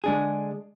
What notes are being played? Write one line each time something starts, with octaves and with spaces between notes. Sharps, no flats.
D3 G#3 D4 G#4